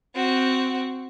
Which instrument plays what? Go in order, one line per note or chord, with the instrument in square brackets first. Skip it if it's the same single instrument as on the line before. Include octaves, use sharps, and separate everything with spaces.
[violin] C4 F#4